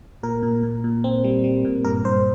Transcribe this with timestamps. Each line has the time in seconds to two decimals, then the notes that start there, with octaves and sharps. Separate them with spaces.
0.23 A#2 A#4
0.43 A#2
0.63 A#2
0.84 A#2
1.04 C4
1.24 G3
1.44 G3
1.65 A#2
1.85 G2 A#4
2.04 G2 C5